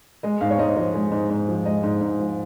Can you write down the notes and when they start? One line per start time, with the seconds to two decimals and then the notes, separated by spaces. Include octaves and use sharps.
0.23 G#3 D#5
0.41 G#2 F5
0.51 C#5
0.59 G#2 D#5
0.76 F3 D#5
0.94 G#3
1.12 G#2
1.30 G#2
1.49 F3
1.65 G#3 D#5
1.83 G#2
2.01 G#2
2.19 F3